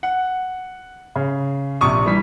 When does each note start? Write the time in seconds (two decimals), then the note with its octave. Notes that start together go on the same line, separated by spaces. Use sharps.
0.03 F#5
1.16 C#3
1.81 A#1 C3 C#6 D#6
2.06 E3 G3 B6